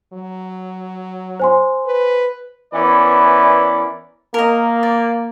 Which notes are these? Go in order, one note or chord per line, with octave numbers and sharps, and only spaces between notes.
F#3
C5 G#5 C6
B4
E3 B3 C#4 A#4 D5 B5
A#3 A#4 D#5
D5